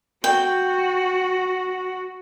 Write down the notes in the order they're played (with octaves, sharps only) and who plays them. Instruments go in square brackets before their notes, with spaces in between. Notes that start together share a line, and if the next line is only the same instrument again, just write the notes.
[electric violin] F#4 [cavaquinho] G5